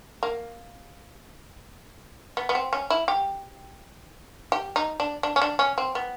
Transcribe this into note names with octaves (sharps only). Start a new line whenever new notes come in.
A#3
B3
B3
C4
C#4
E4
G4
G4
D#4
D4
D4
C#4
D4
C#4
C4
B3